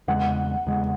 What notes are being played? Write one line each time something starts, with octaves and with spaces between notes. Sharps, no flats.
E2 C#3 G#3 F#5
E2 C#3 G#3